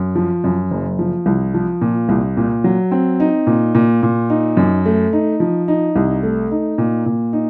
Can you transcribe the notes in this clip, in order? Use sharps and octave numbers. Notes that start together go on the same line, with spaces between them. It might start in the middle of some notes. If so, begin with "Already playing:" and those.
Already playing: F#2
F3
F#2
F#1
F3
C2
F3
A#2
C2
A#2
F#3
C4
D#4
A#2
A#2
A#2
D#4
F#2
A3
D#4
F3
D#4
C2
A3
D#4
A#2
A#2
D#4